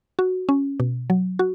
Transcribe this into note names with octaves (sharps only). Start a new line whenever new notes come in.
F#4
C#4
B2
F#3
F#4